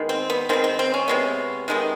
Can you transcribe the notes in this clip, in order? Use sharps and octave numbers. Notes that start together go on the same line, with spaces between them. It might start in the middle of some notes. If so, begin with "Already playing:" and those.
Already playing: D#3 G#3 B3
C4
B3
D#3 G#3 B3 C4
C4
C4
C#4
C3 D#3 G#3 B3
C3 D#3 G#3 B3